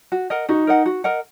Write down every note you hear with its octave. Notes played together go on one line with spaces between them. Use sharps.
F#4
A#4 D#5 F#5
D#4 F#4
A#4 D#5 F#5
F#4
A#4 D#5 F#5